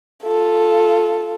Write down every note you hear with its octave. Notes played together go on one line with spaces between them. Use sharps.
F4 A4